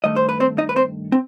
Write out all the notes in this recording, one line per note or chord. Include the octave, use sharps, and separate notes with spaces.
G2 D#3 A3 D#5
C5
B4
C4 C5
D#4 D#5
B4
C4 C5
C4